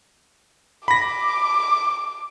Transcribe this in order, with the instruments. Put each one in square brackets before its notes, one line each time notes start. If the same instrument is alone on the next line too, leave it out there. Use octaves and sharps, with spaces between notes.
[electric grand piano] B5 A#6 [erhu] D6